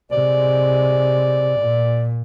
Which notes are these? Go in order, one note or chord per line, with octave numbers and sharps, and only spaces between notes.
C3 G#3 D5
A#2